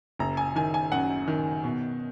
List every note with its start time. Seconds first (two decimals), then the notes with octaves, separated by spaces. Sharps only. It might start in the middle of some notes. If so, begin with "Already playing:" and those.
0.19 F#1 A#5
0.37 G#5
0.56 D#3 G#5
0.74 G#5
0.92 F#2 F#5
1.28 D#3
1.64 B2